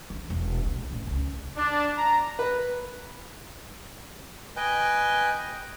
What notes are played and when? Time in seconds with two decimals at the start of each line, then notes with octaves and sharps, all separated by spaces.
0.10 E3
0.30 E1
0.65 A#1
0.91 A1
1.07 C#2
1.57 D4
1.97 A#5
2.39 B4
4.57 B4 D#5 G5 G#5 G6